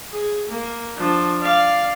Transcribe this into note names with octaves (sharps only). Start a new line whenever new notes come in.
G#4
A#3
F3 D4
D5 F5